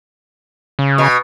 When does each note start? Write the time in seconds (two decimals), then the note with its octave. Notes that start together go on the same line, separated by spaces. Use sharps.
0.79 C#3
0.98 B2